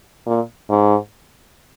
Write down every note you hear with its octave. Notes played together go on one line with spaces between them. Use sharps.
A#2
G#2